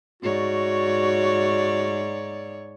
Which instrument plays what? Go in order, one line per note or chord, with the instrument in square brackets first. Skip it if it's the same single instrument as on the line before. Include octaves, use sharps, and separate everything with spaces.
[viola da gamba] G#2 C#5 D5 [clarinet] F#4